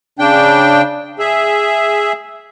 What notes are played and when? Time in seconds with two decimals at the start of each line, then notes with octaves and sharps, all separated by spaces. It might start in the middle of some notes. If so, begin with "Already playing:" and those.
0.19 C#3 D4 G5
1.19 G#4 E5